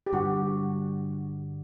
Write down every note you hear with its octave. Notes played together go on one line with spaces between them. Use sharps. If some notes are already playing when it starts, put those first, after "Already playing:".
G4
G2 D3 G3 F#4